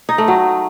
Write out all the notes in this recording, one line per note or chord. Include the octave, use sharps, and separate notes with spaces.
D#4
A3
F#3